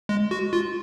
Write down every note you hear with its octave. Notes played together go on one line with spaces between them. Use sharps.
G#3
F#4
F4